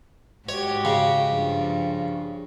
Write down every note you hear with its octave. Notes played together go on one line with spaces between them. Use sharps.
G#2 F#4 G4 C#5
C#3
G2 F3